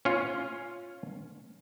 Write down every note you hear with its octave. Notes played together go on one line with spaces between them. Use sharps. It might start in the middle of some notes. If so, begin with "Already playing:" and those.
C#4 F4